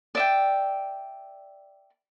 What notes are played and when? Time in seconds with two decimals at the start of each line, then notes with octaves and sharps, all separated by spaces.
0.15 D5 E5 G5